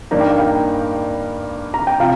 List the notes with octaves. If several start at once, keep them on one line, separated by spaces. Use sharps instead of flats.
G2 G3 A#3 D#4 A#5
G5
F5
G5
A#5
G5
C3 F3 F5